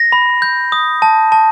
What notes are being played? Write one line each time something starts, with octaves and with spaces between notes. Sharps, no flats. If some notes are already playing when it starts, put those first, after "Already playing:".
Already playing: A#6
B5
G6
D#6
A5
A5